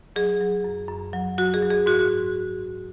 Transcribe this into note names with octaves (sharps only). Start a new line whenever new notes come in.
F#3 G#4
F#3
F#2
F#2
F#3
F#3 F#4
G#4
F#3
G#4
G#2 F#4
F#4